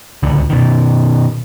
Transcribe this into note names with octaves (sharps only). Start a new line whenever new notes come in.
D1 C#2 D3
B2 D#3